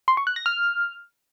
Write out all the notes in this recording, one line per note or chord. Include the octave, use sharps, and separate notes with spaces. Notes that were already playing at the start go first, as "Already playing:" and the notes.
C6
C#6
F#6
A#6
F6